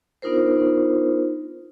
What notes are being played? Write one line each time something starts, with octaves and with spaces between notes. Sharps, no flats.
B3 D4 D#4 F4 A#4 C5